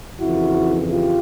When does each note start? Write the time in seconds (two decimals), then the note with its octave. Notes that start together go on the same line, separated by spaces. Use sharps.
0.20 F2 C#3 E3 E4 F#4
0.90 F4 G4